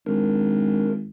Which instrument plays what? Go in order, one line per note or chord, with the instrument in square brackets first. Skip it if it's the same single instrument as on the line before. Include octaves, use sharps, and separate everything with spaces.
[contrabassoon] G#1 [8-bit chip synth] D4 A#4